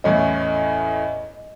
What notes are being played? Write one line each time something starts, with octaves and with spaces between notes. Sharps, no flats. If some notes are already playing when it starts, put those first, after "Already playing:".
E2 A2 C#4 D#5